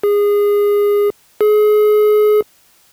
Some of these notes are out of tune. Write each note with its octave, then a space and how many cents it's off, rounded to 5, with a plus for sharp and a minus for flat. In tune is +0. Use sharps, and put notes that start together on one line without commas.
G#4 -20
G#4 +30